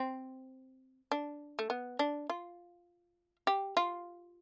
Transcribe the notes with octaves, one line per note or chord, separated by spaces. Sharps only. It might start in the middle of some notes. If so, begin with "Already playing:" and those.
Already playing: C4
D4
A3
B3
D4
F4
G4
F4